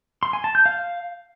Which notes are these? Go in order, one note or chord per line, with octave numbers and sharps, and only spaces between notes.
C6
G#5
A5
G6
F5